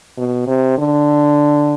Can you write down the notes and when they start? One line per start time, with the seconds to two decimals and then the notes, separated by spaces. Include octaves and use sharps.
0.18 B2
0.47 C3
0.78 D3